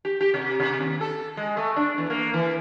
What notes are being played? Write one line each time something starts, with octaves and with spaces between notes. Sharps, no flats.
G4
G4
C3
C3
D#2
A4
G#3
A3
D4
E2
A#3
E3